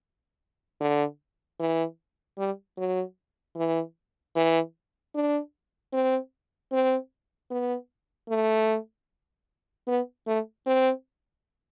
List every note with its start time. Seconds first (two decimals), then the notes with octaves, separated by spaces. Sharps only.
0.80 D3
1.60 E3
2.38 G3
2.77 F#3
3.56 E3
4.35 E3
5.15 D4
5.93 C4
6.72 C4
7.51 B3
8.29 A3
9.87 B3
10.27 A3
10.66 C4